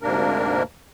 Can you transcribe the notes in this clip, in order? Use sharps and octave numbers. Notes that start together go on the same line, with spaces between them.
D2 G#2 C3 A#3 D4 A#4